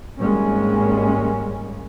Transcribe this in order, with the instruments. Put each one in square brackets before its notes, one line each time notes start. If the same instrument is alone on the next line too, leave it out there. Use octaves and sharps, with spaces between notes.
[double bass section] G#1 G3 G#3 A#3 C#4